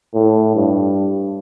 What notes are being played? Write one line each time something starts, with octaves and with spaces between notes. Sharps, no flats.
A2
G2